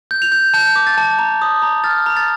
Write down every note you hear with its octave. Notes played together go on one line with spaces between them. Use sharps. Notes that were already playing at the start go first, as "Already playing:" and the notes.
G6
F7
G6
A5 G6
D6
A6
A5
A#5
D#6
A#5
F6 A6
A#5
A6